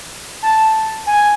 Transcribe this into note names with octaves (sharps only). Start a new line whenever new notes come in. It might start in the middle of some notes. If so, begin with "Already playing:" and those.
A5
G#5